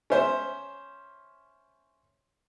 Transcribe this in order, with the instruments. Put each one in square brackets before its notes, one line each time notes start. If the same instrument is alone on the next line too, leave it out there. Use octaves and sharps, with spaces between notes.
[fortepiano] C#4 C5 E5